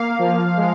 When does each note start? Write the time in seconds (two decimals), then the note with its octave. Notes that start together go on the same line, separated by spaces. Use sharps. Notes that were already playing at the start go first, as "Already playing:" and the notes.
Already playing: A#3 F5
0.19 F3
0.57 G#3